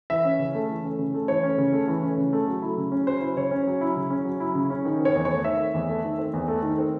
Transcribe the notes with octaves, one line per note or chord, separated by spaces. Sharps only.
E3 E5
C#4
C#3
A3
E3
C#4
C#3
A3
E3 C#5
C#4
C#3
A3
E3
C#4
C#3
A3
F#3
E4
C#3
C#4
F#3 C5
E4
C#3 C#5
C#4
F#3
E4
C#3
C#4
F#3
E4
C#3
C#4
D#3
C4
C#5
E2
C#5
A3
D#3 E5
C4
E2
A3
D#3
C4
E2
A3
D#3
C4